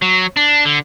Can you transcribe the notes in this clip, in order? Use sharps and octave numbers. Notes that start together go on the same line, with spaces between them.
F#3
D4
D3